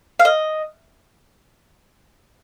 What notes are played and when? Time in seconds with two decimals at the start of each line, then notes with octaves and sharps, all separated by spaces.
0.19 F5
0.25 D#5